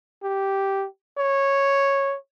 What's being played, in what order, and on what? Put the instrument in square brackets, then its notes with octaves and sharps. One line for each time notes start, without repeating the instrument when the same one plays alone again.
[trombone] G4
C#5